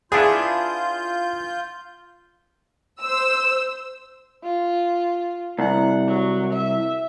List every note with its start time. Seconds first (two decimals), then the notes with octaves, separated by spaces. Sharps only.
0.12 B3 D4 E4 F4 G#4 G6
3.02 C5 E6
4.44 F4
5.59 C2 F#5
6.07 F#3
6.52 E5